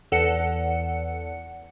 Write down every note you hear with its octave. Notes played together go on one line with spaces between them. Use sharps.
E2 A4 F#5 C#7